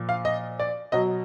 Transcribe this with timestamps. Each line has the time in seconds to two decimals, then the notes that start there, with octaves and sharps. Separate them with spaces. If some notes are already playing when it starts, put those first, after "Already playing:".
Already playing: A#2 F3
0.09 F5
0.25 D#5
0.59 D5
0.92 B2 F#3 D#5